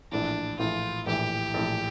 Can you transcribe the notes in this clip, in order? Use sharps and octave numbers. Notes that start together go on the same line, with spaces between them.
A#1 A2 E3 D4
A#1 A2 E3 F4
A#1 A2 E3 G4
A#1 A2 E3